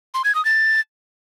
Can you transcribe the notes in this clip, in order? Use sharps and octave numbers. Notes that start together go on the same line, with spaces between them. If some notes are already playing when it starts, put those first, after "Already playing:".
C6
G#6
D#6
A6